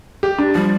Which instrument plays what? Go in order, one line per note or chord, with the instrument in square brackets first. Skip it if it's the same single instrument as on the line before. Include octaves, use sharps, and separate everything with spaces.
[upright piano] G4
D4
[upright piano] F3 [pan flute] G3